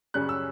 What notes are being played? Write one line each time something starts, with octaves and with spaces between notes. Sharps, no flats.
F#2 C#3 G3 C#4 F#6
E6